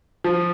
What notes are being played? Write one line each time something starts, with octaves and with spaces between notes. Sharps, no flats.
F3